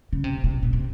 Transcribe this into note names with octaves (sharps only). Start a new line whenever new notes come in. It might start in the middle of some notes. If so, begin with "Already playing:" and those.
C#3
C3
C3
A#2
C3